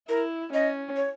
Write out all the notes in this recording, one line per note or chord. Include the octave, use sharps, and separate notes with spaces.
E4 A#4
C#4 D#5
C#5